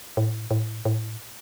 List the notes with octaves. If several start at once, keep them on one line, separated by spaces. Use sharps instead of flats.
A2
A2
A2